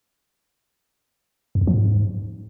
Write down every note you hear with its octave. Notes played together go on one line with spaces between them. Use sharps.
F2
E2
F3
G#2